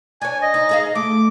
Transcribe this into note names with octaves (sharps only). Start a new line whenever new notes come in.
D4 C#5 G#5
D#5
D#4
D#4 G#4 F5
A3 D6